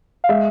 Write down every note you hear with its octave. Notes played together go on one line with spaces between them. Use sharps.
F5
G#3 E5